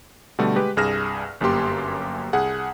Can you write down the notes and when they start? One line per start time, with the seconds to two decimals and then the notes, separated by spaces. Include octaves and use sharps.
0.39 B2 D3 G3 A3
0.56 G#3 G4 B4
0.77 C2 G2 G#4 F6 A#6 E7
1.41 G1 F#2 A#3 G4 C6
2.33 C2 G#4 F#5